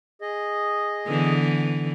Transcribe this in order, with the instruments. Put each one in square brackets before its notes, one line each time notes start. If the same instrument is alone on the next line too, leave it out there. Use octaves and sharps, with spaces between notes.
[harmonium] G#4 D#5
[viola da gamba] D3 E3 B3